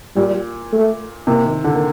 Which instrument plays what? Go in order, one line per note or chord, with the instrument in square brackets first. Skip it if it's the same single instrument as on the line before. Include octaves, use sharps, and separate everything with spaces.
[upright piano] A#2 [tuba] G3
[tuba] A3
[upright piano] C3 [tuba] A#3
[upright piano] D#3
D3
A#3